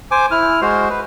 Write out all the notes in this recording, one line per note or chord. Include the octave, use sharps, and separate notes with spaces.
C5 G#5 D6
E4 F6
G#3 F#4 C5 C6
B4